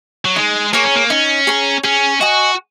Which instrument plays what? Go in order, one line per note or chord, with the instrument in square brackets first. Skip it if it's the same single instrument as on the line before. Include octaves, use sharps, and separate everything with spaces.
[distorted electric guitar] F#3
[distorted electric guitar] G#3 [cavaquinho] D#4
[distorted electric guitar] A#3 [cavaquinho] G#4 C#5 A#5
[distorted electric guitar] C#4
A#3
[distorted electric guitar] C#4 [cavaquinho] D#4
[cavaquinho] G#4 C#5 A#5
[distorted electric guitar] C#4 [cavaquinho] G#4
[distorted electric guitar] F#4 [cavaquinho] D#5 G#5 C#6